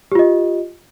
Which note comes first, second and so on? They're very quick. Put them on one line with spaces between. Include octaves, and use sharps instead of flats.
G4 F4 D#5